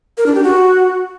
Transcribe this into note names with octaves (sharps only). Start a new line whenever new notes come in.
A#4
D4
G4
F#4